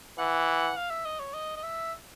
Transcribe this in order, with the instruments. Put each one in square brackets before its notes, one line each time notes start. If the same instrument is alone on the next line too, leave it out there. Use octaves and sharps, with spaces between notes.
[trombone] E3 [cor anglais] F#5
[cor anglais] F5
E5
D#5
C#5
D#5
D#5
E5